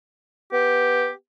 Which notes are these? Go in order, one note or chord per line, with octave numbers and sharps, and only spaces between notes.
B3 G4